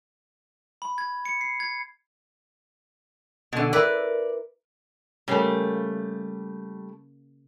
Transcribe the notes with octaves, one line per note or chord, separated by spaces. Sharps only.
B5
G#6
C#7
C7
G#6
B2 D3
E4 A#4 B4 D5
C#3 G3 A3 A#3 F5